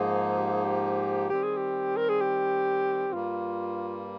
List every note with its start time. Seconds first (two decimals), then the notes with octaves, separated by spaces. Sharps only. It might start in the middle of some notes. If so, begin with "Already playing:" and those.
Already playing: G#2 F3 A#3 D#4 G#4
0.38 G4
0.52 G#4
0.64 G4
1.29 D#3 G3 C4 G4
1.43 G#4
1.57 G4
1.97 A#4
2.09 G#4
2.21 G4
3.13 G2 G3 A#3 F4